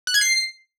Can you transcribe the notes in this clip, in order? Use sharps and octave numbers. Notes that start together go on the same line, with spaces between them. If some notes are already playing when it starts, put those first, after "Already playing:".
F#6
G#6
C7